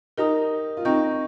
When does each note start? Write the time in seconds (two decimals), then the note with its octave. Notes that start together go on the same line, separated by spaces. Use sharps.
0.18 D#4 G4 A#4 D#5 A#5 D#6
0.77 F4
0.85 C4 D#4 D#5 G5 A#5 C#6 G6